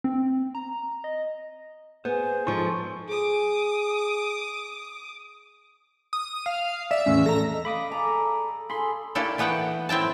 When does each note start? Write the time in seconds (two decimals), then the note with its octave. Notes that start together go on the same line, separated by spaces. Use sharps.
0.04 C4
0.55 A#5
1.04 D#5
2.05 B3 G#4 C5
2.47 G#2 F3 A4 C6 C#6
3.08 G#4 D6 D#6
6.13 D#6
6.46 F5
6.91 D5 E5
7.06 E2 A2 C#4
7.26 A4 A#5 A#6
7.53 D#5
7.65 F5 B5 D6 D#6
7.91 G#4 A4 D5 A#5
8.70 G#4 A4 B5 C6
9.15 A3 A#3 D4 E4 G4 A4
9.38 E3 A3 B3 F#5 G5
9.89 A2 C4 E4 G5 A5